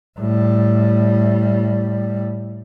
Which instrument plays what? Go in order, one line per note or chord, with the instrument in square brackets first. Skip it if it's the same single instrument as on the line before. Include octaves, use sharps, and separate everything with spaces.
[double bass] A2 G3